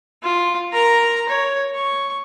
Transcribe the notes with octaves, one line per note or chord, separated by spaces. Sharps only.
F4
A#4 A#5
C#5
C#6